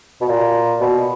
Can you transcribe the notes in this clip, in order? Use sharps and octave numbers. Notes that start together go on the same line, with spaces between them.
B2
A#2
B2